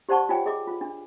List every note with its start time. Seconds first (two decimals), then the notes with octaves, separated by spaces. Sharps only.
0.09 G4 C5 D5 F#5 A5 C#6
0.29 F4 C#5 D5 G5 G#5
0.46 G#4 D#5 D6
0.67 F4
0.81 D4